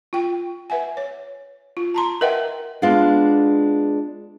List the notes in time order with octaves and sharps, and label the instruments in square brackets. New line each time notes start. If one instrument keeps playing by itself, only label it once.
[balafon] F4 G5
B4 E5 F#5 G#5
C#5
F4
A5 A#5 C6
A#4 B4 D#5 E5 F#5 G5
[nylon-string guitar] G#3 B3 D4 F4